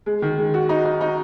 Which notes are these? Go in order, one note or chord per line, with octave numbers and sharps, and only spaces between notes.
G#3
D#3
G#3
F#4
D#4
D#4
D#4